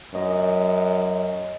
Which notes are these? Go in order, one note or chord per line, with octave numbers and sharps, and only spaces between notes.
F#2 D#5